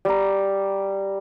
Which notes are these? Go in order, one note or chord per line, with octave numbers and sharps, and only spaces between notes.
G3 A#5